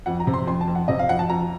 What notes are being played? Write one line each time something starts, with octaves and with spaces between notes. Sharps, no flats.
F2 F#5
A#5
C3
C6
F2 C6
A5
F2
F#5
C3 D#5
F5
F2 F#5
A5
F2 A#5